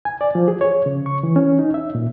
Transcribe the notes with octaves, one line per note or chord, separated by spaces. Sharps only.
G#5
D5
F3
G#4
C#5
C#3
C#6
E3
C#4
D#4
E5
A#2